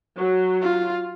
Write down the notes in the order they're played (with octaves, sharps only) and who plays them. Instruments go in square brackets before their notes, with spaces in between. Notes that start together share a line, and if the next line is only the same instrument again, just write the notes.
[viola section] F#3
[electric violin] F4